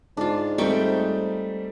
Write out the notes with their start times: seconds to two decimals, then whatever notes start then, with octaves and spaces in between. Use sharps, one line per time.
0.17 G#2 D4 F4
0.58 G3 A3 C4 D#4 G5 C#6